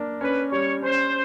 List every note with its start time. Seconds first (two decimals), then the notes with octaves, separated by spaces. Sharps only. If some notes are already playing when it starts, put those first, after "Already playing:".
Already playing: A#3 D4
0.21 C#4 B4
0.51 G3 C#5
0.82 C#4 C5